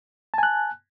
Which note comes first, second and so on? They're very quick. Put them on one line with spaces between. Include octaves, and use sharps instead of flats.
A5 G#5 F#6